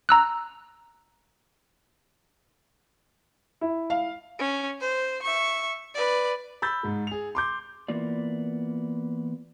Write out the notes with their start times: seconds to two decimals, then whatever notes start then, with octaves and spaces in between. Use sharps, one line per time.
0.09 A#5 E6 F#6
3.61 E4
3.90 F5
4.39 C#4
4.81 C5
5.22 E5 C#6
5.95 B4 D5
6.62 B5 E6 G6 A6
6.83 G#2 G#3
7.07 G#4 F7
7.35 C6 D6 G6
7.88 E3 A#3 B3 F4 D5